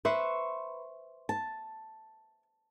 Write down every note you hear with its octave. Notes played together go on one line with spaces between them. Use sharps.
B4 C5 E5 C#6
A5